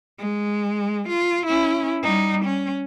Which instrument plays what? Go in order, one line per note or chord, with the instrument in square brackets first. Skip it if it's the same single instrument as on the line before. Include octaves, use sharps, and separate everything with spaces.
[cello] G#3
F4
C#4 E4
G3 D#4
C#4